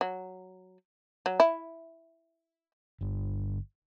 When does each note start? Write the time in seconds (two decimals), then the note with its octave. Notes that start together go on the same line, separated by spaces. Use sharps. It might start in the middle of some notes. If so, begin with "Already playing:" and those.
0.01 F#3
1.26 F#3
1.40 E4
3.01 G1